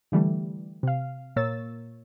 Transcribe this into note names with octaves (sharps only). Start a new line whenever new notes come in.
D3 E3 G3 A3
C3 F5
A#2 A#3 C#5 E6 A6